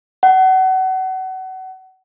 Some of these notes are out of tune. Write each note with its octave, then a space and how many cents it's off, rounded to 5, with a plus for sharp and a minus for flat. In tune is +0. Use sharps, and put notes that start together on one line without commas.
F#5 +30